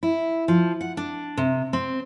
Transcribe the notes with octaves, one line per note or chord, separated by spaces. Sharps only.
E4
F3
F#5
D4
C3
C4